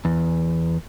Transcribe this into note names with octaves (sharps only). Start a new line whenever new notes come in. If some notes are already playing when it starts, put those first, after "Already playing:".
E2